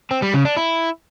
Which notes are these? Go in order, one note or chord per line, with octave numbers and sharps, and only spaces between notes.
C4
G3
C#3
D4
E4